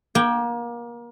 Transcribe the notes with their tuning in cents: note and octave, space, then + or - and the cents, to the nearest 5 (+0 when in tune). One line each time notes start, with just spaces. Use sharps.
A#3 +30 G5 +0